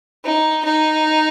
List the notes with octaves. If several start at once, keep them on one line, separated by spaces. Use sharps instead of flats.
D#4
D#4